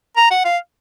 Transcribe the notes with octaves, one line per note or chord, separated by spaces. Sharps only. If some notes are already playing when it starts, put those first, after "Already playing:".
A#5
F#5
F5